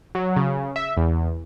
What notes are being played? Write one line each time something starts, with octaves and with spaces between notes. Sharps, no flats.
F#3
C#3
E5
E2